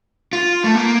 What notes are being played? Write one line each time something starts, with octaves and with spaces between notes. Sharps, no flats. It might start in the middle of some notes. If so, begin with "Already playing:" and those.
F4
A3
A#3